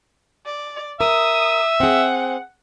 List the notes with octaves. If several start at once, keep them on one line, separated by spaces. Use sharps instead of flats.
D5
A#4 E5 D#6
C4 G#4 F#5